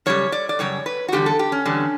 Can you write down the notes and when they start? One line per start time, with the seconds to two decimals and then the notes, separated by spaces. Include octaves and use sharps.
0.06 F#2 C#3 G3 C#5
0.32 D5
0.49 D5
0.59 F#2 C#3 G3 C#5
0.86 B4
1.08 F#4
1.12 E2 D3 G3 G4
1.26 A4
1.39 G4
1.52 C#4
1.66 E2 D3 G3